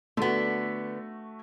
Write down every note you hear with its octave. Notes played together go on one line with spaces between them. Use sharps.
D3 A3 B3 F#4